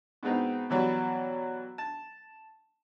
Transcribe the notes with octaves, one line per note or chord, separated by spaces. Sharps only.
B2 G#3 B3 C4 D#4
B2 E3 F#3 G3
A5